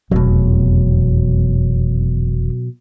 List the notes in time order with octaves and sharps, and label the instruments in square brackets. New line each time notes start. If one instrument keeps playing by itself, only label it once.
[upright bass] F1 E2 [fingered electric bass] B2 F#3